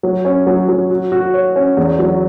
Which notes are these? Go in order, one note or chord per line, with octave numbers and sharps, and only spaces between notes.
F#3
C#4
F#3
F#3
F#4
F#4
C#5
C#4
E2
F#3